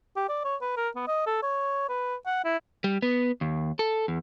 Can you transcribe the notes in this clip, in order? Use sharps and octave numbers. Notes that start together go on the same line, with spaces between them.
G4
D5
C#5
B4
A#4
B3
D#5
A4
C#5
B4
F#5
E4
G3
B3
D#2
A4
E2